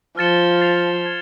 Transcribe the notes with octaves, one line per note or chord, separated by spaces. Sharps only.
F3 F6 A6 C#7 E7 G7
A6 C7 F7
G#6